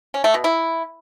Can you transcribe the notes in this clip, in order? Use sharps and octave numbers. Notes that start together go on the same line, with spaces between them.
C#4
A3
B2
E4